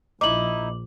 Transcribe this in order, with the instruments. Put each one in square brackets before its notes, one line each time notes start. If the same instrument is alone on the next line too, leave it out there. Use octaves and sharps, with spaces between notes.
[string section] A#1 [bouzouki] D#4 E4 [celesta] D6 F#7